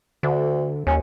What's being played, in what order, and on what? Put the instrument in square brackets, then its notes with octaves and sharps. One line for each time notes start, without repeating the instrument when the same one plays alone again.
[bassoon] D2 [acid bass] D3
[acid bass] D#2 [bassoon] C#4